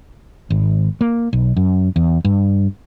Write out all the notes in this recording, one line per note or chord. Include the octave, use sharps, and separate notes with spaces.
G#1
A#3
B1
F#2
E2
G2